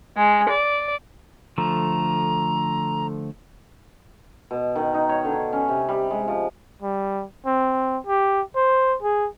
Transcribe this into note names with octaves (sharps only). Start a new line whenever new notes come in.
G#3
D5
D3 F3 A3 A#5
B2
D#3
D#4
C#5
D3
C#4
C3
G3
G#3
F3
G3
C4
G4
C5
G#4